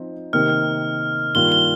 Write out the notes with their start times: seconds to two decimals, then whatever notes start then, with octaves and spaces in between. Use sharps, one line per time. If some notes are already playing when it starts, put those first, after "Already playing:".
Already playing: F3 C4 D#4
0.33 C3 D#3 A#3 D#4 F6
1.35 G2 D#3 A#3 F4 G7
1.52 G7